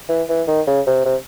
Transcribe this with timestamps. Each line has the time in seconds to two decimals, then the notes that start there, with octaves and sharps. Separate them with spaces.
0.09 E3
0.29 E3
0.48 D#3
0.67 C#3
0.87 C3
1.05 C3